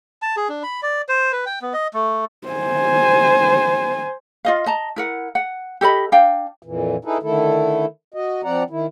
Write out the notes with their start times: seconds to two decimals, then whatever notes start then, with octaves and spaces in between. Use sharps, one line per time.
0.22 A5
0.37 G#4
0.49 D4
0.63 B5
0.83 D5
1.09 C5
1.32 B4
1.46 G5
1.62 B3
1.73 D#5
1.94 A3
2.48 C5 G#5
4.45 F4 D#5 F5
4.66 D#5 A5 A#5
4.96 E4 A#4 F#5
5.35 F#5
5.81 G4 A4 D#5 B5
6.12 D4 F5 G5
6.63 F2 A#2 E3
7.05 D#4 E4 G#4 A4 B4
7.23 D3 D#3 A3 E4 A4
8.14 F#4 D#5
8.44 F3 C4 D5 F#5 A#5
8.70 D#3 E4